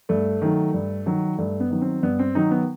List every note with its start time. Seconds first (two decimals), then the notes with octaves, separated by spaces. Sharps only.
0.09 G2 A3
0.42 D#3 F#3
0.74 G2
1.06 D#3 F#3
1.38 G2 A3
1.60 B3
1.70 D#3 F#3
1.81 C4
2.03 G2 B3
2.19 C4
2.35 D#3 F#3 D#4
2.51 B3